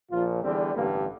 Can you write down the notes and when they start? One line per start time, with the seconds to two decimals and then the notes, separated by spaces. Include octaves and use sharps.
0.11 A#1 A#2 F3 F4
0.42 E2 D3 G3 C4
0.74 A1 G2 D3 A#3